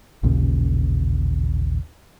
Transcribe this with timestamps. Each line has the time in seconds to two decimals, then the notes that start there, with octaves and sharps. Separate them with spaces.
0.23 A1 D#2 A#2 C#3